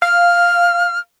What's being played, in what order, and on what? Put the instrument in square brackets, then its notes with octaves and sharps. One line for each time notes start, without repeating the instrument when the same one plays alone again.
[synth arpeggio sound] F5 [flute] F6